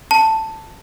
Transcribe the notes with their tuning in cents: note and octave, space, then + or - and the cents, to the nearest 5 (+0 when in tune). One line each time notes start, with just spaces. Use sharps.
A5 +10